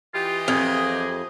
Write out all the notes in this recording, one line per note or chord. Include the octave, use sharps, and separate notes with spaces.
E3 F4 G4 D#5
F2 G#4